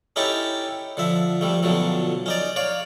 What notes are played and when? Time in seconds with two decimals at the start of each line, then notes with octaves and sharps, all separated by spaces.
0.16 C#4 D#4 E4 G4 A4 C#5
0.97 D3 F3 E5
1.41 F2 G3 A3
1.63 B1 D3 F3 F#3 A3
2.26 C#4 D#4 D5
2.56 C#5 D5 F5